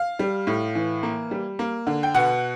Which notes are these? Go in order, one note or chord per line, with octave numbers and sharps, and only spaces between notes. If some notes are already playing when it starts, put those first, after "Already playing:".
Already playing: F5
G3
A2
E3
A#3
G3
A#3
D3
G5
B2 F#5